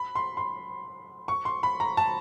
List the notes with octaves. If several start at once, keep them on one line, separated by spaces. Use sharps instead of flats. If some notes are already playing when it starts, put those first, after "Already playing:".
Already playing: B5
C6
C6
C#6
C6
B5
A#5
A5